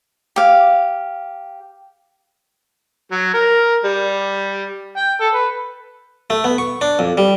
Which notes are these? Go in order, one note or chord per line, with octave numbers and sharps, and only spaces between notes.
G4 F5
F#3
A#4
G3
G5
A4
B4
A3
B3
C#6
D4
F2
G3